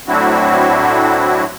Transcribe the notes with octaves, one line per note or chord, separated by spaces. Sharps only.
A2 F#3 C4 D4 E4 F#4